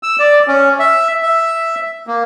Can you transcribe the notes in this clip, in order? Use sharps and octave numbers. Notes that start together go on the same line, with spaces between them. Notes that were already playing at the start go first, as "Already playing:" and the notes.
E6
D5
C#4
E5
E5
A#3